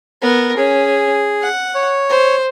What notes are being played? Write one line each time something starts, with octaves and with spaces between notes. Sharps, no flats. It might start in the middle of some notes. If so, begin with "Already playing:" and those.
B3 A#4
C#4 G#4
F#5
C#5
C5